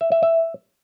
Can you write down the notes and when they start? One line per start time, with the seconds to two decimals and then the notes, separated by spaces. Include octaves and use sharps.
0.01 E5
0.12 E5
0.23 E5